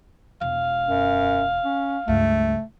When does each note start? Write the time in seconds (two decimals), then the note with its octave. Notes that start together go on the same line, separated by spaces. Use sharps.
0.41 E1 F5
0.88 F#2
1.65 C#4
2.08 C#2 G2 A3